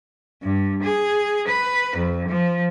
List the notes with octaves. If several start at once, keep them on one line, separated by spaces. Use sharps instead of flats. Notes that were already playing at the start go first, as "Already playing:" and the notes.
G2
G#4
B4
F2
F3